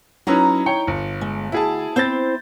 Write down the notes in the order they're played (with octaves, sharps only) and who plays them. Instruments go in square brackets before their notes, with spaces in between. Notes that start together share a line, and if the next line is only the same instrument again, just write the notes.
[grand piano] F#3 C#4 B4 [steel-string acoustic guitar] D#4 E4 A#5
[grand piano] C#5 G5 C#7
G1
[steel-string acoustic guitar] G#3
[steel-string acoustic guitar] D2 [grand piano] E4 G#4 A5
[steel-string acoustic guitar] C4 E4 C5 [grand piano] G6 A6